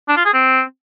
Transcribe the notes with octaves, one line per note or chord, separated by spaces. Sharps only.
D4
F4
G#4
C4